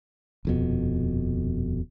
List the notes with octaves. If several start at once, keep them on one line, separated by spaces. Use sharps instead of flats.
D#1 F2 B2